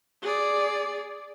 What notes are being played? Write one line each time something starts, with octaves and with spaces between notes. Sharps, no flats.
G#4 D5